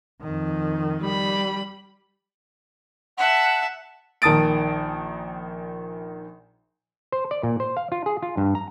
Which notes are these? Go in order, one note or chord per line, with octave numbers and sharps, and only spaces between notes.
F2 D#3
G3 B5
E5 F#5 A5
A#1 D#3 A5 D#6 A6 D7
C5
D5
A#2
C5
F5
F4
G#4
F4
G2
A#5